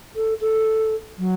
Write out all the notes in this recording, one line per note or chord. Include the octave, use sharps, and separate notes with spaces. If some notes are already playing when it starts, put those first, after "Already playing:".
A4
A4
F#3